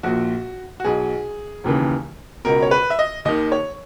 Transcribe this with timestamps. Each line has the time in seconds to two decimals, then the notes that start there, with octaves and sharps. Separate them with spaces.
0.03 A#1 A#2 F#4
0.80 F#4
0.84 B1 B2 G#4
1.64 E1 D#2 C#3 E3
2.45 C#2 B2 A#4
2.62 C#5
2.71 B4
2.90 E5
2.99 D#5
3.25 D#2 D#3 D#5
3.52 C#5